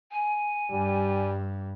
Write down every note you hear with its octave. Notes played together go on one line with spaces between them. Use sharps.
G#5
G2 G3